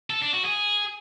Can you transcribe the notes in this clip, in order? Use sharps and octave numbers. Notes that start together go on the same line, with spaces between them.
A4
D4
F#4
G#4